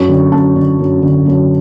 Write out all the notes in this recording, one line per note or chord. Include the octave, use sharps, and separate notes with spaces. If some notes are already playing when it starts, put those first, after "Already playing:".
Already playing: F#2 C#6
D3
F#2 A5
D3
F#2
D3
F#2